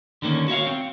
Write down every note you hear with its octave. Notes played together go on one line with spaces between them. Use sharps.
D3 D#3 A#3 C#4
F#4 C#5 E5 F5
C4